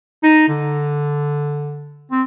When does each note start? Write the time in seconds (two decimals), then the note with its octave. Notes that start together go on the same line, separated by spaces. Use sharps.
0.23 D#4
0.48 D3
2.11 C4